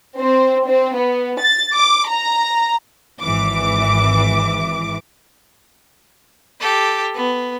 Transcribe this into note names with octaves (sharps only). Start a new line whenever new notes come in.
C4
C4
B3
A6
D6
A#5
G#1 E3 D6
G4 A4
B3